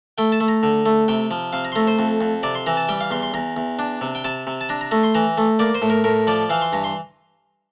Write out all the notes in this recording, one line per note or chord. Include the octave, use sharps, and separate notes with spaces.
A3 G5
A5
A3
A#5
D3
A3
C3 G5
F3
C3 F5
A#5
C6
A3 A#5
C5
F2
F2
C3 D5
C6
E3 A#5
A5
G3 G5
F5
E2 C6
C6
E2 A#5
E2
D4
C3
G5
C3 A5
C3
A5
D4 A#5
A#5
A3 A#5
C6
E3 A#5
A3
A#3 D5
C5
A2
A#4
A2 A#4
F3 D5
E3 F5
C6
G2 A#5
C6